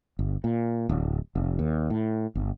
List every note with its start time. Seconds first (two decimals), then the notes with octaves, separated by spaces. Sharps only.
0.19 G1
0.44 A#2
0.89 D1
1.35 F1
1.59 D#2
1.90 A2
2.35 G1